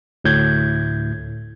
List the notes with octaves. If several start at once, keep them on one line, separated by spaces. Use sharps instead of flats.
D2 A2 G6 G#6